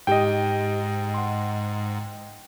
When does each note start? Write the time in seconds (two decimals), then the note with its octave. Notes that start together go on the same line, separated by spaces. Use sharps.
0.07 G#2 D#4 G4 D#5 G5
1.14 F#5 C6